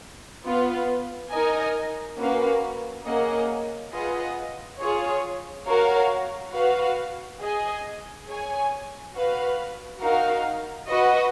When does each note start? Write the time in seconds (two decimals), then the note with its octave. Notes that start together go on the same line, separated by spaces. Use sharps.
0.44 B3 F4 B4
1.31 D#4 A#4 D#5 G#5
2.18 A#3 C#4 F#4 B4 F5
3.05 A#3 C#4 G#4 D#5 F#5
3.92 F4 G#4 B4 D#5 F#5
4.79 F4 G#4 C#5
5.66 F#4 A#4 C#5 F5
6.53 F#4 B4 F5
7.40 G#4 D#5 G#5
8.27 G#4 C#5 G#5
9.13 F#4 B4 F5
10.01 D#4 F#4 A#4 F5
10.88 F#4 B4 D#5